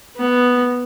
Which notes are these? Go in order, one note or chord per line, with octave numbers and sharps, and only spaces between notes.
B3